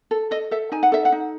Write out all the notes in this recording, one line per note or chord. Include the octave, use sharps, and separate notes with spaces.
A4
A4 D#5
A4 E5
D#4 G#5
F#5
A4 E5
F#5
D#4